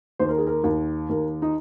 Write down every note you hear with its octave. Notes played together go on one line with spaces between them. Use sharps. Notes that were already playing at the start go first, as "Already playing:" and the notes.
D#2 C5
A#4
G#4
A#4
D#2
D#2 A#4
D#4